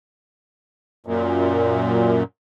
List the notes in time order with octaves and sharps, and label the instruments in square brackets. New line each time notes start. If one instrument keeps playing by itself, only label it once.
[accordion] F#2 A#2